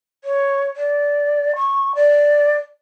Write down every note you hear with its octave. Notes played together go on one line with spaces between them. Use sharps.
C#5
D5
C#6
D5